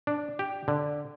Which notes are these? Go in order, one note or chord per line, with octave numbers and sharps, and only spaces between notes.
D4
G4
D3